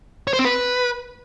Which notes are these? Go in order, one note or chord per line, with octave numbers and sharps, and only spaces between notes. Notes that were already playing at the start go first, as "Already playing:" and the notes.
C#5
C5
C4
B4